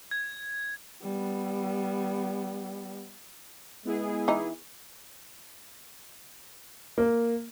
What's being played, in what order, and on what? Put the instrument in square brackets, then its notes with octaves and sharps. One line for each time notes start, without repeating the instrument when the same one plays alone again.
[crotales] G#6
[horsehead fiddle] G3 B3
[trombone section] G#3 [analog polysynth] B3 E4 G#4
[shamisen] E3 D#4
[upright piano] A#3